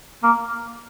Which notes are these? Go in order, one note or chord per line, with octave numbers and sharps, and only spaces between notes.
A#3